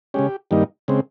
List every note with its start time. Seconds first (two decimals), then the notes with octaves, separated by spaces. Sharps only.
0.14 C#3 G#3 C#4 G4
0.51 G2 D#3 G3 A#3 D#4
0.88 C#3 G#3 C4